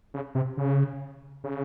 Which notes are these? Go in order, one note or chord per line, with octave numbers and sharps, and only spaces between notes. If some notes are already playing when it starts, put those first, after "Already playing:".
C#3
C3
C#3
C#3